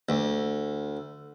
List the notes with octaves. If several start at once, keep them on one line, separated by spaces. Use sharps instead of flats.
D2